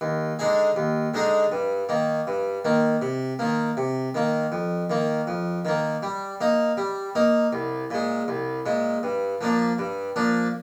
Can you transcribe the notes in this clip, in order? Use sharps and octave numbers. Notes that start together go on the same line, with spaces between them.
D#2
D3 G#3 D#4 G#4
D#2
D3 G#3 D#4 G#4
G2
D#3 A#3
G2
D#3 A#3
C3
D#3 A#3
C3
D#3 A#3
F2
D#3 A#3
F2
D#3 A#3
G3
A#3 D#4
G3
A#3 D#4
C2
A#2 G#3
C2
A#2 G#3
G2
F3 A#3 D4
G2
F3 A#3 D4